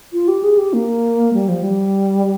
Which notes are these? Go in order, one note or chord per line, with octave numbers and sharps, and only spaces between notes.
F4
G4
G#4
G4
A#3
G3
F3
G3